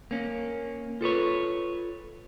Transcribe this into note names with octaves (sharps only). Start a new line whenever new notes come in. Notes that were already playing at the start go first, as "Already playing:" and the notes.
A#3 C#4
F4 A4 B4 C#5